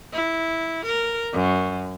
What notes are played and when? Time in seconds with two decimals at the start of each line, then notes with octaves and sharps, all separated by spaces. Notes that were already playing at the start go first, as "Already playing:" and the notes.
0.13 E4
0.86 A#4
1.33 F#2